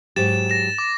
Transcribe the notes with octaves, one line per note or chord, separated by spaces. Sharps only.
G#2 F#3 G4 A6 E7
A#6 E7
D6